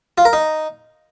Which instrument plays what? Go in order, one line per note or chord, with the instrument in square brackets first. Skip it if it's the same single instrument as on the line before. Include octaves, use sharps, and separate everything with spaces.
[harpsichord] F4
A#4
D#4